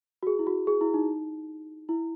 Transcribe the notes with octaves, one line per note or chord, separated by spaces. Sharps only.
F#4
G#4
E4
F#4
G#4
E4
D#4
E4